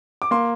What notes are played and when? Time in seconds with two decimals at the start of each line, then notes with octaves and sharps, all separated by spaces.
0.22 D6
0.31 A#3 C6